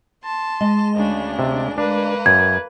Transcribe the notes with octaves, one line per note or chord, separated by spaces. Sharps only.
A5 C6
G#3 D#5
D2 C#3 D4
C3
A#3 D4 B4
F#2 G#6